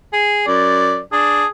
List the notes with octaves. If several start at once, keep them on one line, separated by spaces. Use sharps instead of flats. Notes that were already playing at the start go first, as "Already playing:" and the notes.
G#4
F#2 D5
D4 G#4